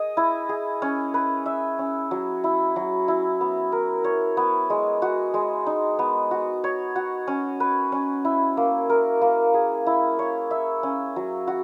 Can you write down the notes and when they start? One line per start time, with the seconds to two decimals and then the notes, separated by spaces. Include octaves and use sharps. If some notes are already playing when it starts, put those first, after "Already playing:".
Already playing: G#4 D#5
0.17 E4
0.49 G#4
0.82 C#4
1.14 B4
1.46 E5
1.79 C#4
2.11 F#3
2.44 E4
2.76 F#3
3.08 E4
3.41 B3
3.72 A#4
4.04 C#5
4.37 B3
4.70 G#3
5.02 F#4
5.34 G#3
5.66 D#4
5.99 B3
6.31 F#4
6.64 C#5
6.95 F#4
7.28 C#4
7.60 B4
7.92 C#4
8.25 E4
8.57 A#3
8.89 A#4
9.21 A#3
9.54 G#4
9.87 E4
10.19 C#5
10.51 E5
10.83 C#4
11.16 F#3
11.47 F#4